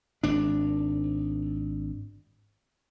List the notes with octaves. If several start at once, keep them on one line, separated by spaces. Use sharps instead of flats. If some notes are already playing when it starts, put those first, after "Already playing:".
G#1 D4